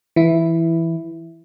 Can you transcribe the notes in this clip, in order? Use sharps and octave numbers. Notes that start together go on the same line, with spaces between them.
E3 E4